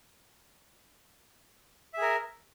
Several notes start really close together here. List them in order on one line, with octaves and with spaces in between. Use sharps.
E5 G#4 A#4